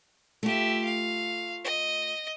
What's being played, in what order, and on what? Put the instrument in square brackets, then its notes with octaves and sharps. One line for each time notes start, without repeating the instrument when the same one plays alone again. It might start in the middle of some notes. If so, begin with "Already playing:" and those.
[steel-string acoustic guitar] A3 F4 [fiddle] G4 E5
[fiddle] F5
D#5